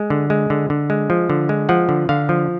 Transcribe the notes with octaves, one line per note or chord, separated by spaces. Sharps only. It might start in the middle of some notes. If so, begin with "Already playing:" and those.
Already playing: G#3
D3
G#3
D3
D3
G#3
F3
D3
G#3
F3 F#5
D3
D3 F5
F3